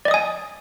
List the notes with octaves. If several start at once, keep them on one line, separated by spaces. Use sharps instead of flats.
D5 D#5 G#5 D#6